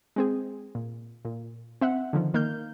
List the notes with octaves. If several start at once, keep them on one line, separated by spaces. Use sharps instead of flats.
G#3 C4 G#4
A#2
A#2
C4 E5 F#5
D3 D#3 F3
D#3 A#3 F6 G6